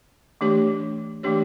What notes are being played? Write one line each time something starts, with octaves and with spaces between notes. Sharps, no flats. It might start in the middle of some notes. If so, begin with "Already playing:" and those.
E3 A3 D4 G4 C#5
E3 A3 D4 G4 C#5